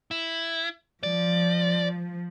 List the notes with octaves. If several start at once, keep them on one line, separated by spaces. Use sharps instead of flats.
E4
F3 D5